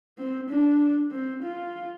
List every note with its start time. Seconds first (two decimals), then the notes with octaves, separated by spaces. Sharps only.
0.18 C4
0.49 D4
1.11 C4
1.43 F4